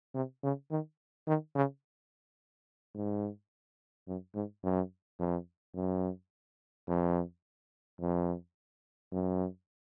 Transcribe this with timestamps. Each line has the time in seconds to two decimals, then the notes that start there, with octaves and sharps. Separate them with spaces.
0.14 C3
0.43 C#3
0.70 D#3
1.27 D#3
1.55 C#3
2.95 G#2
4.07 F#2
4.35 G#2
4.63 F#2
5.19 F2
5.75 F#2
6.88 F2
8.00 F2
9.12 F#2